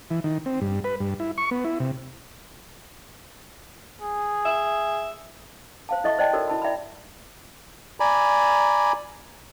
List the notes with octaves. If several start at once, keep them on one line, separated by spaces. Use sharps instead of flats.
E3
D#3
C4
G2
B4
G2
E4
C#6
B3
E4
C3
G#4
E5
C5 F5 A5
E4 A4 D#5 E5 A5 C#6
C5 D5 D#5 G5 A5
D#4 F#4 A4 A#4 C#5 D5
E4 A5 B5
D5 E5 G5 A#5 B5
D5 G#5 A#5 B5